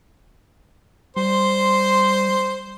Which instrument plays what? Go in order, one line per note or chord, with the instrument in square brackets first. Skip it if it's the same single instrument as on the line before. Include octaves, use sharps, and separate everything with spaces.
[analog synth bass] G3 [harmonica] C5 [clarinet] C6